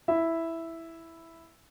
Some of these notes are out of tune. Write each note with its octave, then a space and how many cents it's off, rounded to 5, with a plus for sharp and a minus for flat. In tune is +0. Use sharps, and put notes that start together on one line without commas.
E4 +0 E5 +0